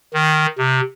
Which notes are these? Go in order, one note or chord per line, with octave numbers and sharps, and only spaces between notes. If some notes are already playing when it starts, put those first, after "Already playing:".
D#3
C3